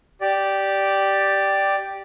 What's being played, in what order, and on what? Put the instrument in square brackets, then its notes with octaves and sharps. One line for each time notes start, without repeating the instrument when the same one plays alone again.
[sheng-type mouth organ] G4 D5